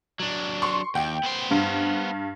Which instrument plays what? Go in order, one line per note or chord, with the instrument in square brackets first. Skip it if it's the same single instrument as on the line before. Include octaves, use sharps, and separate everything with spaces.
[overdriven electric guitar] F#3 D4
[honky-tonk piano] C6 C#6
[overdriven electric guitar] D#2 [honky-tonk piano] G5
[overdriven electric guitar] B3 C5
[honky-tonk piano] G2